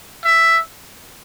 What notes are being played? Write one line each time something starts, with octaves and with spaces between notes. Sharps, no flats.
E5